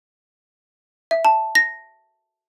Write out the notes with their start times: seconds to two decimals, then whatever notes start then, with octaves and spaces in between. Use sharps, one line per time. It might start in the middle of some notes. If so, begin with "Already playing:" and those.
1.11 E5
1.25 A5
1.55 A#6